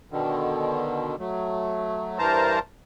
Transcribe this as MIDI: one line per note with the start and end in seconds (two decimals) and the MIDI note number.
0.11 1.16 47
0.11 1.16 50
0.11 1.16 51
1.19 2.19 54
1.19 2.19 57
2.19 2.59 43
2.19 2.59 52
2.19 2.59 70
2.19 2.59 72
2.19 2.59 81
2.19 2.59 82